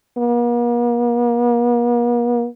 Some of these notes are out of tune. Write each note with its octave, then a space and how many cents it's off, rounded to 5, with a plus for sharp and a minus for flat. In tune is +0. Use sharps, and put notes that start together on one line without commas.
A#3 +45